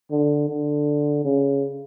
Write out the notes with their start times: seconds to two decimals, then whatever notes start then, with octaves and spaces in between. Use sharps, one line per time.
0.11 D3
0.49 D3
1.24 C#3